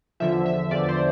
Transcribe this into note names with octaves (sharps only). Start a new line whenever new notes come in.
E2 D3 F3 E5
E5
E2 D3 F3 D5
C5